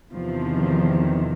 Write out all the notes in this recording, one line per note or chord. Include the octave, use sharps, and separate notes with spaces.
E2 C3 D#3 F3